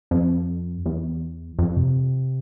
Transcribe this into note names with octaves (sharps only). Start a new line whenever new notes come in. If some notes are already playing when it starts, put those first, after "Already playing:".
F2
E2
F2
C3